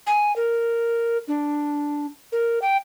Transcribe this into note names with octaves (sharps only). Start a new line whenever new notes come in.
G#5
A#4
D4
A#4
G5